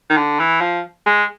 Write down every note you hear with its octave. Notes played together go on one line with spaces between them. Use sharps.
D#3
D3
E3
F3
G#3